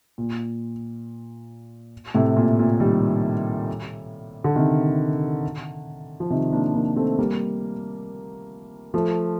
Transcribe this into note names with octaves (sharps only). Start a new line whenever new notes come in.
A#2
A2 C3
A#2
A#2
D#3 G3
D3
C3 D#3
F3
C3 D#3
A#3 D4
A#3 D4
A3 C4
G3 A#3
F3 A3